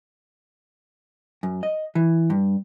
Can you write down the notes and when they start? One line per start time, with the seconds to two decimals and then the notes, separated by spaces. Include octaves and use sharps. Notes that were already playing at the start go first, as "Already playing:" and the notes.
1.43 F#2
1.63 D#5
1.95 E3
2.30 G2